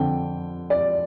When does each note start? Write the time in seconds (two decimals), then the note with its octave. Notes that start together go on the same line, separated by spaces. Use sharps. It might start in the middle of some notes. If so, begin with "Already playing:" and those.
Already playing: F2 D3 G5
0.70 D5